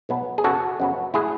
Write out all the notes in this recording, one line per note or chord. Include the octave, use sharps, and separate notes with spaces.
B1 B2 F#3 B3
G#4
F#2 C#3 F#3 B3 F#4 A4
F#2 C#3 F#3 B3
A2 F#3 E4 G#4